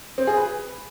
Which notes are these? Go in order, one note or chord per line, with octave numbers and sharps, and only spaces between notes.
C4
G#4
B4